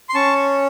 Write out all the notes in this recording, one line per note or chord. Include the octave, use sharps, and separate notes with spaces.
C6
C#4 A5 C#6